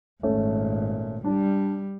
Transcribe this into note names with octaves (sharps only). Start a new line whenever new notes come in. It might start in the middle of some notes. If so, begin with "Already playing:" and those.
G#1 A#2 A3 C#4
G3 D4